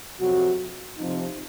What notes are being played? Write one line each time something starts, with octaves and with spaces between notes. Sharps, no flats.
F2 C3 F#3 C4 F#4
C3 F3 C4 D#4